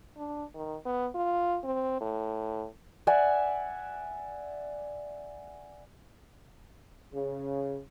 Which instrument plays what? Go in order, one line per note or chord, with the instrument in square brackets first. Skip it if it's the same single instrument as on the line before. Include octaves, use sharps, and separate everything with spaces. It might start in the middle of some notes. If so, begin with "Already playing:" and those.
[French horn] D4
D#3
B3
F4
C4
A2
[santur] D5 E5 F#5 G#5
[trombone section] C#3